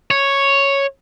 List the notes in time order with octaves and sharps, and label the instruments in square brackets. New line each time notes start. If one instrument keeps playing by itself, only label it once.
[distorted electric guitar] C#5